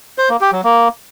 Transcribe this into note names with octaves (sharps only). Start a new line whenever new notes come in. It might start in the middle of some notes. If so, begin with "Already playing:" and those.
C5
A#3
G4
F#3
A#3